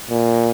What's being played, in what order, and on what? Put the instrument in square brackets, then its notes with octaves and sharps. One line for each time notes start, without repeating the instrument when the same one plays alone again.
[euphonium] A#2